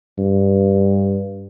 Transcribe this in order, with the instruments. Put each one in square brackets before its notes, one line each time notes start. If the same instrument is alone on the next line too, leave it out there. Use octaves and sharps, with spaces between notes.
[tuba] G2